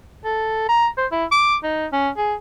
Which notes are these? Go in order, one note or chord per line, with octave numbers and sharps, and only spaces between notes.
A4
A#5
C5
E4
D6
D#4
C#4
G#4